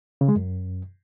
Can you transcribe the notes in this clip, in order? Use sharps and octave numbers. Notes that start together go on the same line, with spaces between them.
C#3
G#3
F#2